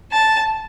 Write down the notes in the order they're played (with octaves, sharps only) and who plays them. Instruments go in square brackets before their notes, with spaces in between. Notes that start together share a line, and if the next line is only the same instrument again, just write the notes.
[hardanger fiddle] A5